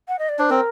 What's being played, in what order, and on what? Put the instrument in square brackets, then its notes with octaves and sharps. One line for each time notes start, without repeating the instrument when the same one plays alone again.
[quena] F#5
D#5
D5
[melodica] D4 [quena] C5
[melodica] C4 [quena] A#4